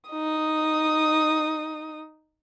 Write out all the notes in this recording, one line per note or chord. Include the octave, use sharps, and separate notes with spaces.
D#4 D#6